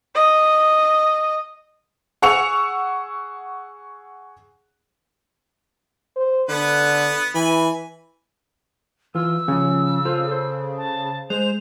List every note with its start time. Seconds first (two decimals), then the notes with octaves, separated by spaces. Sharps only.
0.14 D#5
2.22 G#4 F#5 C#6 E6 C#7 F7
6.16 C5
6.49 D3 B3 B4
7.35 E3 G#5 B5
9.15 E3 F4 E6
9.48 C#3 F3 C#4
10.05 F4 A4 C5
10.28 A4 C5
10.77 A5
11.30 G#3 C5 F7